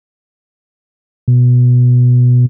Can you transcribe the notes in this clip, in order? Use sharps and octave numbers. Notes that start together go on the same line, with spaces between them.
B2